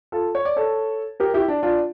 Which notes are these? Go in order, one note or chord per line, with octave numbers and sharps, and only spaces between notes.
F4 A4
C#5
D5
A4 C#5
G4 A#4
E4 G4
D4
D4 F4